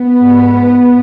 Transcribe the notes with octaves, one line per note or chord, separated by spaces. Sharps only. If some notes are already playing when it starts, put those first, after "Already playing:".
Already playing: B3
G#2